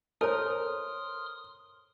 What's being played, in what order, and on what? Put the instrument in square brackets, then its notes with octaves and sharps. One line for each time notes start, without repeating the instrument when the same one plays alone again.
[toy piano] A4 C5 C#5 [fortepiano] A#4 [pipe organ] C6 D#6 F6